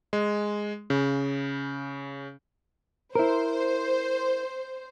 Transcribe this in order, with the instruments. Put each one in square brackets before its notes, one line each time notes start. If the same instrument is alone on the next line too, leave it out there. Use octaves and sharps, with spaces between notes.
[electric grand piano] G#3
C#3
[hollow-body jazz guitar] E4 A#4 [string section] C5